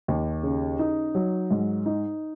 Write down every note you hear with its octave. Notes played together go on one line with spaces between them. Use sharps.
D#2
C#3
D#4
F#3
G#2
D#4